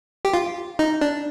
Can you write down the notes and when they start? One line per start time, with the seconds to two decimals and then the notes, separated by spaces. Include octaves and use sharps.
0.25 G4
0.34 F4
0.79 D#4
1.01 D4